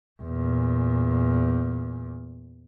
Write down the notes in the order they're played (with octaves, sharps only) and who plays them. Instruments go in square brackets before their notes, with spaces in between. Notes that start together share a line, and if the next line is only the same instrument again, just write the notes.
[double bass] E2 A#2